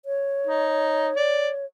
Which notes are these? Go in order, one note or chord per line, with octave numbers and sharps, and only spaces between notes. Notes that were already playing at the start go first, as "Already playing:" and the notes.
C#5
D#4
D5